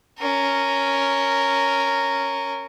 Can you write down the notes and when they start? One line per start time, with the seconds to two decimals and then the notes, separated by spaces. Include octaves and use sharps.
0.19 C#4 A#4